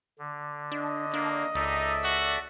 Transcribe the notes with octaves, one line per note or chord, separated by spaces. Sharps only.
D3
D4 D#5
A#3 D4
C#2 D#4 A4 D5 E5
F#4